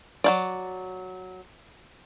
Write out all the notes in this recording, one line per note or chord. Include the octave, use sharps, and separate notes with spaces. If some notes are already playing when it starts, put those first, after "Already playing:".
F#3 A#3 D5